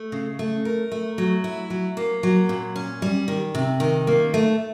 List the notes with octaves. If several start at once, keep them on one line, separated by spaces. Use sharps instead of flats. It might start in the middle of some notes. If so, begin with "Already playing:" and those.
Already playing: A3
C#3
A3
A#4
A3
F#3
E4
F#3
A#3
F#3
A#2
C#4
G3
D#3
C3
D#3
A#3
A3